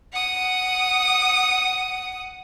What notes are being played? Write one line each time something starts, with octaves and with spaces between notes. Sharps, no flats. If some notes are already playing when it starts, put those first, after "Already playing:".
F#5 D#6